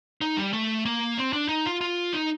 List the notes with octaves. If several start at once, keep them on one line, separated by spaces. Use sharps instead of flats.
D#4
G3
A3
A#3
C4
D4
D#4
F4
F4
D#4